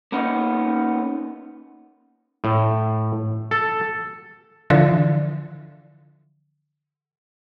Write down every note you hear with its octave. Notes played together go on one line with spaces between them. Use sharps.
A#3 B3 C#4 D#4
A2
A4
D3 E3 F3